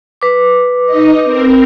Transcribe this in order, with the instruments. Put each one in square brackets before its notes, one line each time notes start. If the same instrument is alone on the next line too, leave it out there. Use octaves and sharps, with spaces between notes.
[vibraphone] B4 D6
[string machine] D#4 D#5
C4 A#4